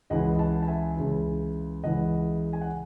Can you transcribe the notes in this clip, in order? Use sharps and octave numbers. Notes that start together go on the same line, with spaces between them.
C#2 C#3 E3 D#5 F#5
F#5 A5
A5
E5 G#5
C#2 C#3 E3
C#2 C#3 E3 D#5 F#5
G#5
F#5